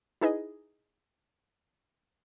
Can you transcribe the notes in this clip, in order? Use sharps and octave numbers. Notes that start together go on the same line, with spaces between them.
D#4 E4 G#4 B4 D#5